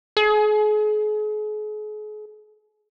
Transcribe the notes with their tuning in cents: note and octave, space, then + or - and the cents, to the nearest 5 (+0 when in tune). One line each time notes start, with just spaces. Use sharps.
G#4 +40